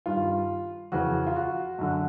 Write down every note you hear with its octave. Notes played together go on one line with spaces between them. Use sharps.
G2 D#3 F4
F2 C#3 E3 F#4
F4
F#4
F#2 D3